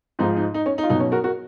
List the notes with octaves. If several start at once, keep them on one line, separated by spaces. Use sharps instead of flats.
G#2 F3 G#3 D#4
D#4
D#4
C#4
D#4
F4
B2 F#3 D#4
C#4
F#4 A#4
F#4 A#4